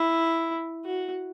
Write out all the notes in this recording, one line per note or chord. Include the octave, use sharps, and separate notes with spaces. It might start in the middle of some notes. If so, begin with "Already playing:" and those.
Already playing: E4
F#4